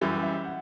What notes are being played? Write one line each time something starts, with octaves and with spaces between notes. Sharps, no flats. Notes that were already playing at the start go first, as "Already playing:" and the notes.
F#2 E3 G3 E5
E5
F#5